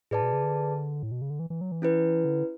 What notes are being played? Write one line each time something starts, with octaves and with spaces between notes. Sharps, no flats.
A2 G#4 B4 D5 A5
B2
C#3
D3
A2
B2
C#3
D3
E3
E3
F#3
E3
C#4 E4 B4
D3